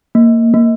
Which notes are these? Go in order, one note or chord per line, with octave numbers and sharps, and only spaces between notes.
A#3
A#3